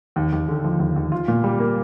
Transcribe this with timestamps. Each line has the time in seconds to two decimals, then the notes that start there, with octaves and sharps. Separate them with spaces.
0.16 D#2
0.32 D#2
0.48 D3
0.64 F3
0.79 D#2
0.96 D#2
1.12 F4
1.28 A#2
1.44 G3
1.60 A#3